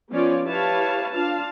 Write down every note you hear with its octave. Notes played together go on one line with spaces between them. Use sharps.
F3 B3 C#4 F4 C#5 D5
E4 G4 B4 C#5 F5 A5
D4 F4 F5 A5